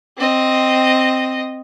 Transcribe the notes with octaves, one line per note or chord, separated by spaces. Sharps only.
C4 D#5